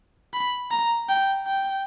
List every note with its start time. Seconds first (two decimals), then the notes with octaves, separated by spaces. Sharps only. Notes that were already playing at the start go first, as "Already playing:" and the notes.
0.33 B5
0.71 A#5
1.09 G5
1.47 G5